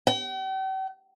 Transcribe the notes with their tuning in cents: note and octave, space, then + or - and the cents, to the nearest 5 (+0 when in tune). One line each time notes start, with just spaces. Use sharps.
G5 -45